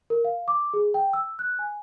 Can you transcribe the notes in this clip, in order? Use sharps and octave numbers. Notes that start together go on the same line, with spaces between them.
A#4
F5
D6
G#4
G5
E6
F#6
G#5